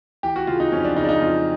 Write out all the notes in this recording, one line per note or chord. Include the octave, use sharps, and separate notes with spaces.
E3 G4
F#4
C#3 F4
D#4
F2 C#4
D4
C#3 D#4
D4
D#4
F2 F4